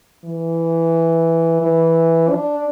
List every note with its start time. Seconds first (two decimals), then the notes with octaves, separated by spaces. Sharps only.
0.25 E3
1.62 E3
2.31 D4